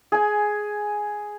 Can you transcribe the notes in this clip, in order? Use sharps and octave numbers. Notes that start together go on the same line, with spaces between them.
G#4 G#5